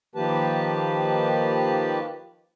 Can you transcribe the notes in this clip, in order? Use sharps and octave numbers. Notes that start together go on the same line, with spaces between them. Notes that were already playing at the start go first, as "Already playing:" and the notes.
D#3 F3 A#3 G4 B4 A5